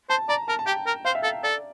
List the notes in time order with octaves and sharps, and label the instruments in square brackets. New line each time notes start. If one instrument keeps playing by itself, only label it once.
[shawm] C5 [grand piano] A5
[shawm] D5 [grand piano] A#5
[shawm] A#4 [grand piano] A5
[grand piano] A5
[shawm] G4 [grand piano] G5
[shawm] A#4
[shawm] C5 [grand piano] F5
[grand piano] E5
[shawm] A4 [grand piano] F5
[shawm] A4 [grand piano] D5